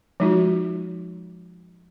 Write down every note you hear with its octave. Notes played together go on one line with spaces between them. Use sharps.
F3 G#3 D#4 F4 F#4